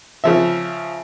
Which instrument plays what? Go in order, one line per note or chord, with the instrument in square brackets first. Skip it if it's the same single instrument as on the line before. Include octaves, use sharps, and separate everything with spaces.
[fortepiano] C#3 F3 E5